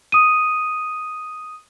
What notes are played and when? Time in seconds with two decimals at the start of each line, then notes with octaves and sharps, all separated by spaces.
0.12 D#6 D#7